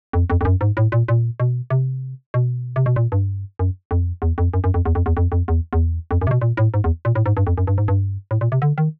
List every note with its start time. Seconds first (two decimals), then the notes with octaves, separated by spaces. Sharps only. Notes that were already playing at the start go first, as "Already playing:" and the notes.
0.13 F2
0.30 F2
0.41 F2
0.45 F#2
0.61 G#2
0.77 A2
0.92 A#2
1.08 A#2
1.40 B2
1.70 C3
2.34 B2
2.76 C3
2.86 B2
2.96 A#2
3.12 G2
3.59 F#2
3.91 F2
4.22 E2
4.38 F2
4.54 F#2
4.64 F#2
4.74 F2
4.86 E2
4.95 F2
5.06 E2
5.17 F2
5.32 F2
5.48 E2
5.73 E2
6.11 F2
6.21 F#2
6.27 C3
6.31 B2
6.42 A#2
6.57 A2
6.74 G#2
6.84 E2
7.05 A#2
7.15 A2
7.26 G#2
7.37 G2
7.47 F2
7.58 F#2
7.67 G2
7.78 G#2
7.88 G2
8.31 A2
8.41 A#2
8.52 C3
8.62 D3
8.78 D#3